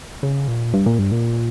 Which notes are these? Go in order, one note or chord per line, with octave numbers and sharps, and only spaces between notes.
C#3
A#2
G2
A#2
G2
A#2